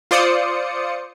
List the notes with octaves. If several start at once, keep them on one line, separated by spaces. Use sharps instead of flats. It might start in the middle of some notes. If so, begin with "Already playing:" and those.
F4 C5 D5 D#6 C#7